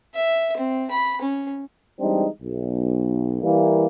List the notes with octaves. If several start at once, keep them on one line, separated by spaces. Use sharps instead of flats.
E5
C4
B5
C#4
E3 G3 G#3 C4 D4 D#4
B1
E3 G3 A#3